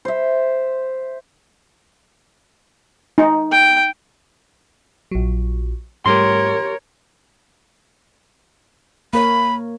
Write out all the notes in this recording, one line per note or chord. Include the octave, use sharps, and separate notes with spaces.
C5 E5
D#4
G5
A#1 F#3
G#2 G3 A3 G4 A#4 C#5 C6
A#3 A#4 C#5 B5